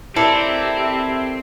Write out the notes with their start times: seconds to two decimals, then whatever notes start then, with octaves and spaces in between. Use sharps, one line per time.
0.16 C4 E4 G4 A4 A#4 D5 E5